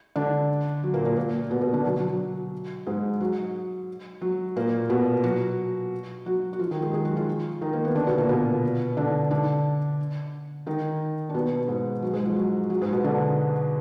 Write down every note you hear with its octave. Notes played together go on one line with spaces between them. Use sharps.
D3 D4
F#3
A#2 A#3
A#2 A#3
A#2 A#3
B2 B3
B2 B3
D3 D4
F#3
F#3
F#3
G#2 G#3
F#3
F#3
A#2 A#3
B2 B3
F#3 F#4
F#3 F#4
F#4
F3 F4
D#3 D#4
G#3 G#4
G#3 G#4
F#3 F#4
F3 F4
D#3 D#4
A#3
B3
D3 D4
B2 B3
A#2 A#3
B2 B3
D3 D4
D3 D4
D#3 D#4
D4
B2 B3
G#2 G#3
F#3
G#2 G#3
F3
F#3
F#3
G#2 G#3
B2 B3
D3 D4